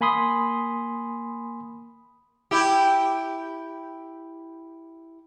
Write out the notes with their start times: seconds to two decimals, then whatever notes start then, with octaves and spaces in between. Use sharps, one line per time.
0.01 A#3 G#5 B5 C6 D#6
2.51 E4 G4